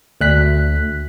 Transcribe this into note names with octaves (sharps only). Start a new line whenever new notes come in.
D2 F#6 B6